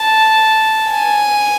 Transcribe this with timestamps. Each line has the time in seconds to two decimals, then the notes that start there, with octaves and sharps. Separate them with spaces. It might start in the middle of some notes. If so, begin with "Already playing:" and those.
Already playing: A5
0.91 G#5